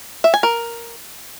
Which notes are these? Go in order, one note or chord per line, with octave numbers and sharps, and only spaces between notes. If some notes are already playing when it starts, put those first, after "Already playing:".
E5
G#5
A#4